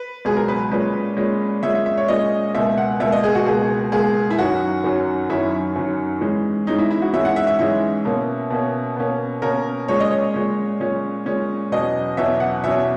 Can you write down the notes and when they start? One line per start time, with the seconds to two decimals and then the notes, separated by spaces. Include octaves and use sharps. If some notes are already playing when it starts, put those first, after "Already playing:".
Already playing: B4
0.25 C#2 B2 F#3 B3 G#4
0.37 A#4
0.48 B4
0.71 A#2 G#3 C#4 B4
1.17 A#2 G#3 C#4
1.63 A#2 G#3 C#4 E5
1.75 E5
1.86 E5
1.97 C#5
2.08 A#2 G#3 C#4 D#5
2.55 C#2 B2 A#3 E5
2.78 F#5
3.00 C#2 B2 A#3 E5
3.12 D#5
3.24 G#4
3.35 F#4
3.46 C#2 B2 A#3 G#4
3.92 C#2 B2 A#3 G#4
4.31 E4
4.38 F#2 D#3 F#3 C#4 F#4
4.84 F#2 D#3 F#3 C#4
5.30 F#2 D#3 F#3 C#4 E4
5.76 F#2 D#3 F#3 C#4
6.21 G#2 E3 G#3 C#4
6.67 G#2 E3 G#3 C#4 D#4
6.79 E4
6.90 E4
7.02 F#4
7.13 G#2 E3 G#3 C#4 E5
7.25 F#5
7.36 E5
7.47 E5
7.59 G#2 E3 G#3 C#4 E5
8.05 B2 A#3 C#4
8.50 B2 A#3 C#4
8.97 B2 A#3 C#4
9.42 B2 A#3 C#4 A#4
9.88 A#2 G#3 C#4 C#5
10.00 D#5
10.11 C#5
10.34 A#2 G#3 C#4
10.80 A#2 G#3 C#4
11.26 A#2 G#3 C#4
11.72 E2 B2 F#3 C#4 D#5
12.17 E2 B2 F#3 C#4 E5
12.40 F#5
12.63 E2 B2 F#3 C#4 E5